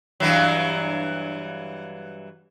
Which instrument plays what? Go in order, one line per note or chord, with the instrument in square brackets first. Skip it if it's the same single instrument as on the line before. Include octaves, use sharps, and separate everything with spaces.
[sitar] G2 E3 F#3